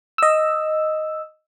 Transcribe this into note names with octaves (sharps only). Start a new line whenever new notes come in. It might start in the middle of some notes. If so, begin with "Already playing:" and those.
D#5 E6